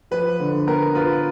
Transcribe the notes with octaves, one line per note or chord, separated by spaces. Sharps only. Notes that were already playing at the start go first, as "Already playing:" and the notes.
F3 B4
D3
B3 A#4
F4 B4